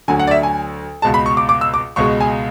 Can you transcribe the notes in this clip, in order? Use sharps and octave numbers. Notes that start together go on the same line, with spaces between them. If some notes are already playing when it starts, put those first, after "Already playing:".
D2 D3 F#3 G#5
F#5
D5
E5
G#5
C#2 B2 G#3 A5
B5
C#6
D6
D6
E6
D6
C#2 B2 G#3 C#6
G#5